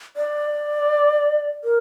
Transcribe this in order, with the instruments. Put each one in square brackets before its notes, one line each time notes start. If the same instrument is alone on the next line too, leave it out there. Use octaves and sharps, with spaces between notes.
[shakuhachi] D5
A#4